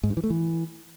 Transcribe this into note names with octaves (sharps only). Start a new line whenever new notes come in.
G#2
G2
E3
A3
E3